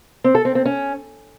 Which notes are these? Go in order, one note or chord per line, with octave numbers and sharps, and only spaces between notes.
C4
A4
C4
C4
C#4